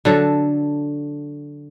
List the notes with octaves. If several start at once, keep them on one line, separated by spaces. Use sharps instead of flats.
D3 F#3 A4